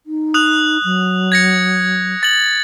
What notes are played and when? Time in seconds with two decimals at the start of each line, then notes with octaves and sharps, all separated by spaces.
0.06 D#4
0.34 D#6 F#6 F7
0.84 F#3
1.32 G#6 A#6 C#7
2.23 A6 F#7